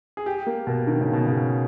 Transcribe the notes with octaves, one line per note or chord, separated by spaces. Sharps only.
G#4
G4
A#3
B2
D#3
C#3
B2
C#3